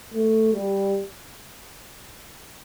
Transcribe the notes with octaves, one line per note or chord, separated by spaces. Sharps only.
A3
G3